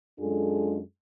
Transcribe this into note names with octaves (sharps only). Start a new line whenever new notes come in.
F#2 G#3 D4 F4 G#4 A4